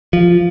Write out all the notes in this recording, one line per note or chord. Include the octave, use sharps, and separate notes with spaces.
F3